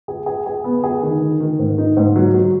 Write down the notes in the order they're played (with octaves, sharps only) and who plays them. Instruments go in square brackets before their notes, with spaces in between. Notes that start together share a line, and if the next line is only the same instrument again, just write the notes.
[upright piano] G#4
G#4
G#4
B3
G#4
D#3
D#3
D#3
G#2
D#4
G#2
F#3
F#3